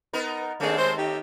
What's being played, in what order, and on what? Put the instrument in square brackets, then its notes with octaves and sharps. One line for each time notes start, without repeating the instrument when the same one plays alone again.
[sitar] B3 D#4 A#4
[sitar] D#2 A3 C4 [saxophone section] A#3 D4 G#4
[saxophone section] G#3 C5
D#4 G4